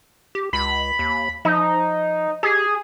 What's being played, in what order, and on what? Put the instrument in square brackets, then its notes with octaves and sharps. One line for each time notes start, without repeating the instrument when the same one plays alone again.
[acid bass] G4
[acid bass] C#2 [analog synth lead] B5
[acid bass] D#2
[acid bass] F3 [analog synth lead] D#4
[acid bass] G4 [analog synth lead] G#4